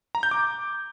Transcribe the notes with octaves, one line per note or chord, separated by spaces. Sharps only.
A#5
G6
D6